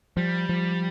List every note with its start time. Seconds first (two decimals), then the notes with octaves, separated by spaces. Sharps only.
0.17 F3 G3
0.49 F3